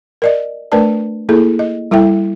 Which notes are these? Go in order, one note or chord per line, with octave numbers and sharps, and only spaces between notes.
A#4 D5 D#5
A3 D4 A#4 B4 D5 A5
A#3 E4 G#4 A4
D#5
G3 E4 A4 E5 G5